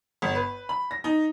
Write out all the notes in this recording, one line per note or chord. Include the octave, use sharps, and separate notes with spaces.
G1
B4
B5
A#6
D#4